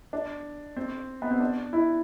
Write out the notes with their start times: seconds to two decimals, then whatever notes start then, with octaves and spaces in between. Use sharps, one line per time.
0.13 D4
0.76 C4
1.22 B3
1.31 C4
1.40 D4
1.73 E4